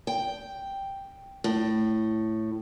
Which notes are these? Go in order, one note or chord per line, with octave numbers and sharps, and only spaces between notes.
G5
A2